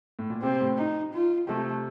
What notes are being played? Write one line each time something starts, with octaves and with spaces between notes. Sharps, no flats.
A2
A#2
C3 C4
A2
D#4
F4
C3 A3